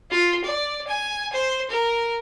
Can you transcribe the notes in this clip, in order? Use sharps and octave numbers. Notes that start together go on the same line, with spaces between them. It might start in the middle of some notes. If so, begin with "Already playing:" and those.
F4
D5
G#5
C5
A#4